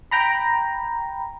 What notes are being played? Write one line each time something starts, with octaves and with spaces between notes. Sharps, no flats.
G5 A#5 B5